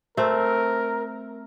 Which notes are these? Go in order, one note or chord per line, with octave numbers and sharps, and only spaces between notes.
A3 C4 A#4